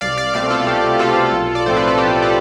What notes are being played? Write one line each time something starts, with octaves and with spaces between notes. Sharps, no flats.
C2 D5 F5
D5 F5
B2 A3 C4 D5 F5
F4 A4
C2 G4
B2 A3 C4 F4 A4
B1
D5
A2 F3 A3 C4 C5
B4
A4
B1 G4
A4